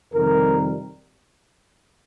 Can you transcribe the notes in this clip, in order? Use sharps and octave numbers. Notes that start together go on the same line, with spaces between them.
F2 C3 D#3 G3 A#4